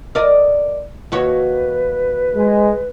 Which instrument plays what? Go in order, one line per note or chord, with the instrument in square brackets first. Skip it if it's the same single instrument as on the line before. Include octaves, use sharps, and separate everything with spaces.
[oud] A#4 D5 D#5
[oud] D#2 F#4 C#5 [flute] B4
[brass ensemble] G#3